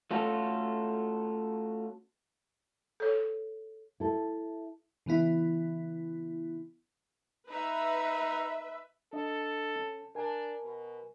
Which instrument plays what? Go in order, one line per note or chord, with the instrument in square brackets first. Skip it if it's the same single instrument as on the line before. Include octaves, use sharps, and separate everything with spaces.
[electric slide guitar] A3 C#4 F4 F#4 A4
[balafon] A4 C#5
[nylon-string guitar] E4 A4
[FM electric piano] C#3 E3 B3 E4
[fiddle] D#4 [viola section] B4 E5
[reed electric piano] D4 D#5 [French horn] A4
[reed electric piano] C#4
[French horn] D4 [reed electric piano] A#4 G#5
[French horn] B2